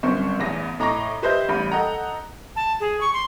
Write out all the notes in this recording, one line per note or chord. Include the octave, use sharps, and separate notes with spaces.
G1 F#2 C4 C5 C#6
A1 E2 A#6
A2 D#5 A#5 C#6 D6 A#6
G4 B4 C5 D#5 E5 G6
A1 G3 B5
A4 D#5 F#5 A#5
A5
G#4
C#6
C6